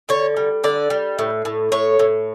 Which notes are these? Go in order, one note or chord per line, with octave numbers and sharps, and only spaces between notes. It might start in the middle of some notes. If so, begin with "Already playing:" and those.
D3 C#5
G3
D3 D5
G3
A2
A2
A2 C#5
A2